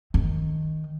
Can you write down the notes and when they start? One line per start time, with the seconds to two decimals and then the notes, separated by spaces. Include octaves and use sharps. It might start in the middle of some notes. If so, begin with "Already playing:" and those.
0.14 D#3